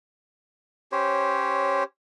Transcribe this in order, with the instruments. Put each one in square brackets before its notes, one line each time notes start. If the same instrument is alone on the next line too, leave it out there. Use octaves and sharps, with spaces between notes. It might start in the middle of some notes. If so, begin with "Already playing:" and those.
[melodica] C#4 G4 C5 C#5